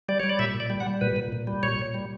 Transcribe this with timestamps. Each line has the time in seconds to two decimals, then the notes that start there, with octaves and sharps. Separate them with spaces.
0.09 G3 D5
0.20 G3 C#5
0.29 D5
0.39 A#2 E5
0.54 A#2
0.60 D5
0.70 G3
0.80 F#5
0.86 G3
1.01 A#2 B4
1.16 A#2
1.32 A#2
1.47 G3
1.63 A#2 C#5
1.79 A#2
1.94 G3